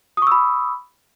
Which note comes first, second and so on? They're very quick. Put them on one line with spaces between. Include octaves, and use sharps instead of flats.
D#6 C#6 E6 B5